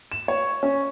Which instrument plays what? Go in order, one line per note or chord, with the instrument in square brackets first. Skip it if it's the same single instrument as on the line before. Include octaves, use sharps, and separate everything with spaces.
[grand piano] E7
C#5
C#4